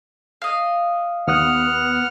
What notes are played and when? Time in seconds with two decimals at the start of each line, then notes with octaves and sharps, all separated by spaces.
0.42 D#5 F5
1.28 D#2 B3 F#5 D#6 F6 F#6